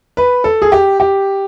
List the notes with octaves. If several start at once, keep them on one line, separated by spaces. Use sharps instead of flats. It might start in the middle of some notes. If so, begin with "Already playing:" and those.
B4
A4
G#4
G4
G4